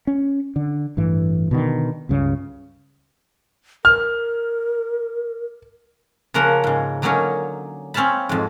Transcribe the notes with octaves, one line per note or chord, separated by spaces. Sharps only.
C#4
D3
A1 G2 E3
B2 D3 D#3
C#2 G2 C#3
A#4 F6
C#3 F3 A#3 A#4 F#5
G#2 C#3
D3 F#3 A#3 C#4 D#4
C4 C#4 F5 A5 B5
F2 G#2